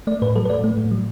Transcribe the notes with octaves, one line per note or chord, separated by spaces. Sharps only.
A3 D5
A2 B4
F#3 A4
B4
A2 D5
A3
A2
F#3